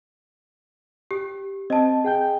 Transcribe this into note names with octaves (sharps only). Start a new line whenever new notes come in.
G4
C4 D#5 A5
G#4 G5 G6